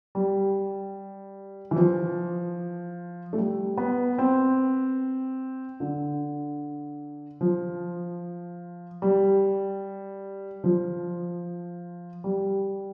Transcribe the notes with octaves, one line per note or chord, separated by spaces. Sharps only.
G3
E3
F3
A3
G3
B3
C4
D3
F3
G3
F3
G3